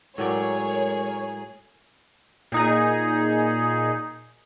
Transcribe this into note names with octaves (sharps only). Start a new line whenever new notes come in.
A2 F#3 G#3 G#4 A#4 C#5 D5
A#2 D#4 G#4